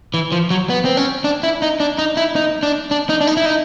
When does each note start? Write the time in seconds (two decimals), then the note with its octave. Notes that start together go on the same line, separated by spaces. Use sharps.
0.14 E3
0.32 F3
0.50 F#3
0.70 B3
0.85 C4
0.97 C#4
1.24 D4
1.43 E4
1.62 D#4
1.80 D4
1.98 D#4
2.17 E4
2.36 D#4
2.63 D4
2.91 D4
3.09 D#4
3.21 D4
3.27 D#4
3.37 E4
3.46 D#4